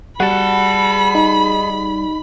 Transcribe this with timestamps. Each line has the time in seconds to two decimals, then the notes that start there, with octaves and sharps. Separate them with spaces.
0.20 G3 F#4 G#4 F#5 A5 B5
1.15 D#4